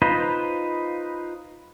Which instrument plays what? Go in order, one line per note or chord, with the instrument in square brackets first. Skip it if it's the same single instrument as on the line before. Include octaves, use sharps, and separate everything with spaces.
[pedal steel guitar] D#4 F4 B4 C5 D#5